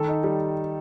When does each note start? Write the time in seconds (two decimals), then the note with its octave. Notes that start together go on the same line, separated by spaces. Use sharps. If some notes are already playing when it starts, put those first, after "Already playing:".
Already playing: D#3 A4
0.08 D#4
0.24 G3